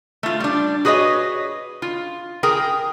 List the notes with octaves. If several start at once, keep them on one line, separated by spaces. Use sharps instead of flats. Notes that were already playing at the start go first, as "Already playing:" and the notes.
A3 F4
G3 D4
F#4 G#4 B4 C#5 D#5
F4
G#4 A#4 G5